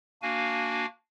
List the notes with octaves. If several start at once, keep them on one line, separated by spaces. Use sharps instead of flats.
A#3 D4 F#4 F5 G#5